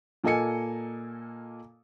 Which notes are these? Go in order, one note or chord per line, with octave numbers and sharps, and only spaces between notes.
A#2 A#3 A4 D#5 G#5 C#7